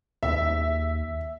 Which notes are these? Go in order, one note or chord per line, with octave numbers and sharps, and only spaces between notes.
D#2 E5